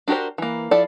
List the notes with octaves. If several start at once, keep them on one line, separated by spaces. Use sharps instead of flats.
D4 F#4 G4 A#4 C5
E3 A#3
F3 E4 A4 D5